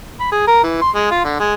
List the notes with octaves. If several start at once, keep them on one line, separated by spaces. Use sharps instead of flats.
B5
G#4
A#4
E3
C6
G#3
F4
D3
G#3